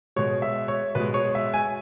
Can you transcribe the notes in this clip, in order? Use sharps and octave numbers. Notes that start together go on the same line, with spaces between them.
B2 G#3 C#5
E5
C#5
B2 G#3 B4
C#5
E5
G#5